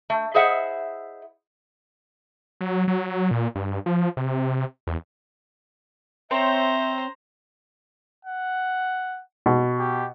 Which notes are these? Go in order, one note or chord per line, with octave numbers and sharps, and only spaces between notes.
A3
E4 G#4 C5 D#5 E5 F#5
F#3
F#3
A#2
G2
F3
C3
E2
C4 C5 C#5 E5 G5 A#5
F#5
B2
G4